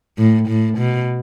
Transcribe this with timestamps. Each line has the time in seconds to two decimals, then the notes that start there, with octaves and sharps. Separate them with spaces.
0.18 A2
0.48 A2
0.78 B2